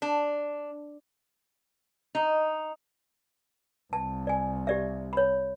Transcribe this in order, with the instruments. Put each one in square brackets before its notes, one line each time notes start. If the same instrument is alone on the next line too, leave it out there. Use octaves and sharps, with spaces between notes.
[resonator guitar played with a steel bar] D4
D#4
[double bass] C2 [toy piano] A5
[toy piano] D5 G#5
G4 D5 E5
C#5 B5